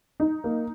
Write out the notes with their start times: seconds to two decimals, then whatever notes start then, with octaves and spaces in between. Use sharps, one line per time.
0.20 D#4
0.44 A#3